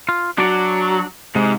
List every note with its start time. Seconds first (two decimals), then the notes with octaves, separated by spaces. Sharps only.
0.09 F4
0.38 F#3 D4 D5
1.35 G#2 C3 G#3